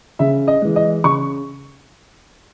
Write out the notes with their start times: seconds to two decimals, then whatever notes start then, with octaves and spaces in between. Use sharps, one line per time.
0.19 C#3 E5
0.48 D#5
0.62 E3 G#3
0.76 D#5
1.04 C#3 C#6